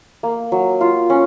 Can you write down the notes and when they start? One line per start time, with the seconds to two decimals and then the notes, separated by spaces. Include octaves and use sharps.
0.23 A#3
0.52 F#3
0.81 F4
1.10 C#4